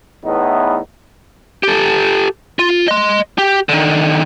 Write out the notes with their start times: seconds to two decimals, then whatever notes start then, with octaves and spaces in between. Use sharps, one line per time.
0.25 E2 A2 B3 D#4
1.63 G4 A4
2.59 F4
2.88 D#5 C6
3.38 G4
3.69 D3 D#3